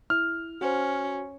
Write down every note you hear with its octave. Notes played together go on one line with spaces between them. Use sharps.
E4 F6
C#4 F#4 C5